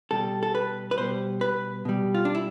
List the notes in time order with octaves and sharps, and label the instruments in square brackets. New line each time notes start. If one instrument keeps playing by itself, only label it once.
[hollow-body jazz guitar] B2 G3 A4
A4
B4
B4
B2 G3 C5
B4
B2 G3
F4
D4
E4